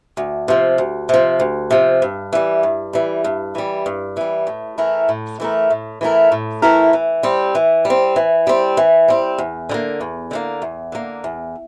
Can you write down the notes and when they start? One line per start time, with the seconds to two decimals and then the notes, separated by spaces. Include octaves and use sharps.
0.17 D2
0.48 C3 F3
0.78 D2
1.09 C3 F3
1.40 D2
1.71 C3 F3
2.02 G2
2.33 E3 G3
2.63 G2
2.93 E3 G3
3.24 G2
3.55 E3 G3
3.86 G2
4.17 E3 G3
4.47 A2
4.78 E3 A3 E4 A#4
5.09 A2
5.40 E3 A3 E4 A#4
5.70 A2
6.01 E3 A3 E4 A#4
6.32 A2
6.62 E3 A3 E4 A#4
6.93 E3
7.23 G3 C4
7.55 E3
7.85 G3
7.90 C4
8.16 E3
8.47 G3 C4
8.77 E3
9.08 G3 C4
9.38 E2
9.69 D3 G3
9.74 A#3
10.01 E2
10.31 D3 G3 A#3
10.62 E2
10.92 D3 G3 A#3
11.24 E2